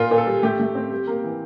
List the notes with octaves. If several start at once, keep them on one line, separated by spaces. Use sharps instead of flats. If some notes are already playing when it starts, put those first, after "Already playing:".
Already playing: A#2 F4
A#2
A4
G3
A3 G4
A3
C4
G3
A#3
E3